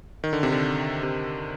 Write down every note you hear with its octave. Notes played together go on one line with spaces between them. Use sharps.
D#3
D3
C3
D3
C3